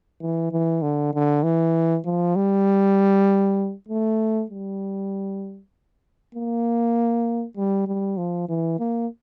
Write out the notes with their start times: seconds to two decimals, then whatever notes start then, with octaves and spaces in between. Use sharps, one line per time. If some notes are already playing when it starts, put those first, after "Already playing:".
0.21 E3
0.51 E3
0.82 D3
1.14 D3
1.43 E3
2.05 F3
2.36 G3
3.89 A3
4.50 G3
6.35 A#3
7.57 G3
7.87 G3
8.17 F3
8.49 E3
8.79 A#3